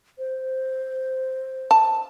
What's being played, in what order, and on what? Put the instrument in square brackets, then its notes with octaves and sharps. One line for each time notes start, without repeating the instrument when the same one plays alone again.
[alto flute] C5
[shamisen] A5